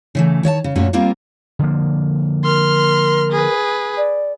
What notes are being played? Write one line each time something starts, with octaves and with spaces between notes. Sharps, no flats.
C#3 E3 A3
D#3 C#5 D#5 A5
C#3
F#2 A#2 A3 C#4 F#4
G3 A#3 C4 F4 A#4 C5
D3 F3 A#3
A#4 C6 F6
G#4 B4
D5